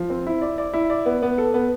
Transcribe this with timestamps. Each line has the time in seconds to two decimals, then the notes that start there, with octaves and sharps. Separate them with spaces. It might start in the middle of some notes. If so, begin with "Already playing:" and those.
Already playing: F3
0.10 C4
0.27 E4
0.42 D5
0.58 D5
0.74 E4
0.90 D5
1.06 B3
1.23 B3
1.38 A4
1.54 B3